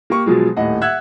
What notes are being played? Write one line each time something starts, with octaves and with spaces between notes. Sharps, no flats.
A#3 G4 C#6
B2 F3 F#3 G#3
D#1 A2 D#5 F#5
E5 F#5 E6 F#6 G#6